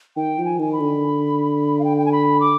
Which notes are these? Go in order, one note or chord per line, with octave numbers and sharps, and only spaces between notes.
D#3 G5
F3
G#5
D#3 G#5
B5
D3
F5
G5
G5
G#5
B5
D6